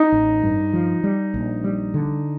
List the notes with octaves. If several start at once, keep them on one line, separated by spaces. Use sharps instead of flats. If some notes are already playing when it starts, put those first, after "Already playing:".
Already playing: D#4
A1
G2
F3
G3
A#1
G3
D3